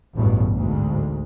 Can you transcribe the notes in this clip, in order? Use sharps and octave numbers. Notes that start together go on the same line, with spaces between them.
A1 E2 G2 B2
D2 G#2